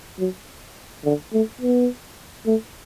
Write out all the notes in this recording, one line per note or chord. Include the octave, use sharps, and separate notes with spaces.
F#3
D3
A3
B3
A3